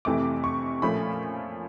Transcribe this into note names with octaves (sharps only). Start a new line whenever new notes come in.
F2 C3 E3 A3 D6
C#6
A#2 F3 A3 C#4 B5